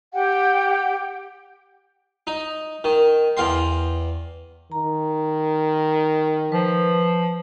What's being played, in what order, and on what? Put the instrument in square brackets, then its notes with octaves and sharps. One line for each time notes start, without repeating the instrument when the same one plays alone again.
[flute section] G4 F#5 G5
[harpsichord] D#4
D#3
E2 F5 G5 C6
[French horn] D#3 [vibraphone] A#5
[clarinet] F3 [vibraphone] B4